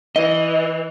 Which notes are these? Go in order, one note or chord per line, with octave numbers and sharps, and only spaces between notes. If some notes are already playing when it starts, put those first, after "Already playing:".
E3 D#5